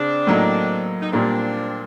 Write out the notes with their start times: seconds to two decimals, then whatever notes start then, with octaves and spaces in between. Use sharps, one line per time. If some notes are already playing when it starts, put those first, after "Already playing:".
Already playing: C#3 C4 D4
0.27 A2 F#3 A#3 D#4
1.02 D#4
1.12 A#2 G3 A#3 C4 D4